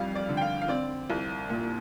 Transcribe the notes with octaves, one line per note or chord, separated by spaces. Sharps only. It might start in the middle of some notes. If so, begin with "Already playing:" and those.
Already playing: F2 G3 F5
D5
D3
G5
F5
F5
C4 D5
C2
A#2